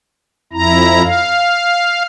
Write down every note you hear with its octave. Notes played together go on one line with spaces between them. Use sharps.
F2 E4 A#5
F5